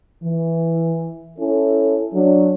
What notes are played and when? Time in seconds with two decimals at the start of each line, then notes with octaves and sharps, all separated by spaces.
0.23 E3
1.38 C#4 E4 A4
2.14 F#3 D4